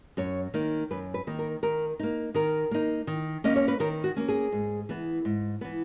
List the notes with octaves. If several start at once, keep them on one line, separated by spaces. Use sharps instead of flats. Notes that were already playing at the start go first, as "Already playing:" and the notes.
F#2 C#5
D#3 A#3 D#4
F#2 B4
B4
D#3 A#3 D#4
A#4
D#3 A#4
A#3 D#4
D#3 A#4
A#3 D#4
D#3
A#3 C#4 D#5
C#5
B4
D#3 A#4
F#4
A#3 C#4
G#4
G#2
E3 B3
G#2
E3 B3